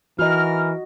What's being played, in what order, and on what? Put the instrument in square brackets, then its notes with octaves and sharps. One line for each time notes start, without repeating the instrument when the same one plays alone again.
[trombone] E3 [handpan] F#4 D#5 [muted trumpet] A#4 [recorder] F6